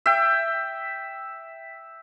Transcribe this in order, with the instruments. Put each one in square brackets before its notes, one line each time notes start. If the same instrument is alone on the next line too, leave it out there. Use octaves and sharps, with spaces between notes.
[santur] E5 G5